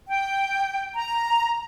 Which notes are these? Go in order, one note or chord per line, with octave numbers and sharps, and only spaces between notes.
G5
A#5